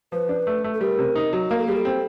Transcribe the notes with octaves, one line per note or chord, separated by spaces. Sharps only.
F3 B4
D4
A3
A3
A4
G3 A#4
C3
D#4
F#3
A#3 A#4
A4
G3 G#4
A4
C4